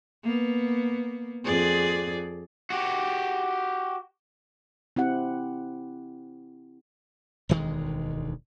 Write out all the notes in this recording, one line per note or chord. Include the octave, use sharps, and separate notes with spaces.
A#3 B3
F2 G#4 D5
F#4 G4
C4 E4 G4 F#5
E1 D2 D#3 G#3